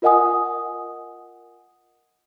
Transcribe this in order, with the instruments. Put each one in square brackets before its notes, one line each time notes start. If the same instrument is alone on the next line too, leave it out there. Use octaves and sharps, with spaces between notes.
[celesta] F4 A#4 D#5 F#5 G#5 D#6